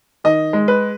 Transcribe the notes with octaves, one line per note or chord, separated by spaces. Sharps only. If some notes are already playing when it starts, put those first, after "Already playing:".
D#3 D#5
G#3
B4